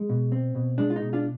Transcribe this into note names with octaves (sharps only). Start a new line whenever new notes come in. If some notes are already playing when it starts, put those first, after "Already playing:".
Already playing: G#3
B2
C4
B2
G#3 D4
F4
B2 D#4
D4 F4